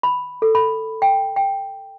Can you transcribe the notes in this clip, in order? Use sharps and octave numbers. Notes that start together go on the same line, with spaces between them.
B5
A4
B5
G5
G5